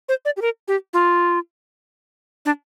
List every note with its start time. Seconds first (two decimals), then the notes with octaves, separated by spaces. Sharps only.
0.09 C5
0.25 D5
0.37 G4
0.42 A#4
0.68 G4
0.93 F4
2.45 D4